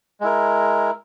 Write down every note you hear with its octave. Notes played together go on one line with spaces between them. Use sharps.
G#3 E4 A#4